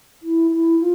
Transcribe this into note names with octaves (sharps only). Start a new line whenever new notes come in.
E4
E4
F4